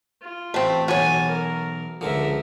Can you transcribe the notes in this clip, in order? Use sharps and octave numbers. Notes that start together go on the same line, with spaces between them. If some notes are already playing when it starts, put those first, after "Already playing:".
F4
A1 A3 C4
B1 E3 F#4 C#5 G#5 A5
A#4
C#2 D3 F3 A#4 E5